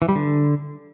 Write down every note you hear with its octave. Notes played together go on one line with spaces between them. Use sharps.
E3
G3
D3